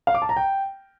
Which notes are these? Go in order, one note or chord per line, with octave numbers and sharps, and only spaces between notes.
F5
D6
A5
A#5
G5